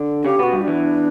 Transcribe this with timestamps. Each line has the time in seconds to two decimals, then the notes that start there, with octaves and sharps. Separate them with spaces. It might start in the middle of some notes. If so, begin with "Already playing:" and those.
Already playing: D3 D4
0.24 C#3 C#4 G4
0.39 B2 B3 F#4
0.53 G2 G3
0.62 D4
0.67 E2 E3